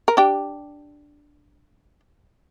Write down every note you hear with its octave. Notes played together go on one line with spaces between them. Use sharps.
A#4
D4 G4